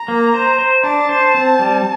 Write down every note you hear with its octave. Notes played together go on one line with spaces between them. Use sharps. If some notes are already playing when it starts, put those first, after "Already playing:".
Already playing: A#5
A#3
C5
C5
D4 A5
C5
C4
G3